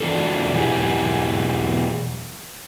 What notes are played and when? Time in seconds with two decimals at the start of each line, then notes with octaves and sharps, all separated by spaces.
0.01 E3 D4 F4 F#4 A4
0.53 E2 B2 F#3 E4 G4 G#4